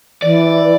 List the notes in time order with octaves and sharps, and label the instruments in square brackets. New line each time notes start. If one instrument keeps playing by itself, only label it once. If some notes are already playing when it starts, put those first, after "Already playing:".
[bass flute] E3 [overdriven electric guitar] D5